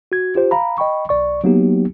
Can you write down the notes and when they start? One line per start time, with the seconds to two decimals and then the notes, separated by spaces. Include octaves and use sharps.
0.12 F#4 G#6
0.35 F4 G4 C5
0.51 F5 A#5 B5
0.78 D#5 G5 B5 C#6
1.09 B1 D5 C#6
1.44 F#3 A#3 B3 D#4 G4